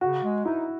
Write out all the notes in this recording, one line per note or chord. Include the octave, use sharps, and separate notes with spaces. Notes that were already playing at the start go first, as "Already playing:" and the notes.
C#3 F#4
G#3
D#4 E4